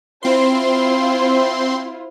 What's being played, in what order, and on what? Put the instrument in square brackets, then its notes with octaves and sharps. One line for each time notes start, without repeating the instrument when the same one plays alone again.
[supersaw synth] C4 C6 [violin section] E4 F4 C5